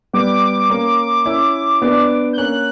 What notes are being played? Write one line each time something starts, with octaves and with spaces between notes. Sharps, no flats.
G3 B3 D6
A#3 C#4
C#4 E4
B3 D4
G6
A#3 C#4 F#6